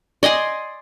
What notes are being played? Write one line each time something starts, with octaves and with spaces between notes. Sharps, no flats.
D5 D#5 G#5 C6